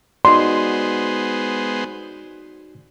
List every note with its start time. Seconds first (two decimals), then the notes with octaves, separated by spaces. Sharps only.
0.25 G#3 B3 D#4 F#4 C5 D5 C6